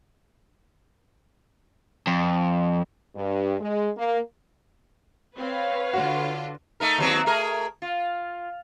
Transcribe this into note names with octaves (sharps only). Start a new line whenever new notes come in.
F2
G2
G#3
A#3
C4 B4 C#5 F5
D3 F4 F#4
A3 D#4 A#4
D#2 F#3 C4
A3 G#4 A#4
F4